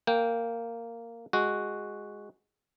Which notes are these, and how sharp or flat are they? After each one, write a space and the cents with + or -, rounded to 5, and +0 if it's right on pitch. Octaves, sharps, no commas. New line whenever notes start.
A#3 -10 G5 +0
G#3 -5 F#4 +0